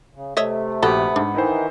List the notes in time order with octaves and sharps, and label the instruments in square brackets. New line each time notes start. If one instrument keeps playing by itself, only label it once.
[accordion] C#3
[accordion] C3 A3 [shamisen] C#5 D#5 E5
[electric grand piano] A#1 G4 [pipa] B3 [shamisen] F#4 A4
[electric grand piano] G#2 [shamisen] D4
[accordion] D#3 E3 [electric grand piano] D#4 E4 C5